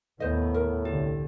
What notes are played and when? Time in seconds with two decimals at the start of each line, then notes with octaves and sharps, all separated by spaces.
0.20 D#2 A2 B3 C5 D#5
0.54 A#4
0.85 C2 D3 G4